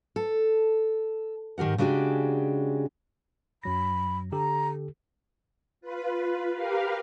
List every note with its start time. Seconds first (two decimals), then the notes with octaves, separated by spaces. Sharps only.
0.16 A4
1.58 G#2 D#3 G4 A#4 F#5
1.78 C#3 G#3 D4 F#4 G4
3.64 F#2 F#3 B5 A#6
4.32 D3 G4 A4 A#5
5.81 F4 B4
6.54 G4 A#4 B4 F5